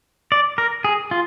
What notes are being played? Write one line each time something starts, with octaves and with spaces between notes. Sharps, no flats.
D5
A#4
G#4
F4